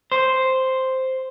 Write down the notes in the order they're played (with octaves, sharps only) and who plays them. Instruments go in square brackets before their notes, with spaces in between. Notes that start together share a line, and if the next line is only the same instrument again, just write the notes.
[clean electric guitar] C5